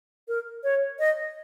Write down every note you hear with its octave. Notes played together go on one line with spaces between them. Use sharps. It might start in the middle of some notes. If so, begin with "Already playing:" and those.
A#4
C#5
D#5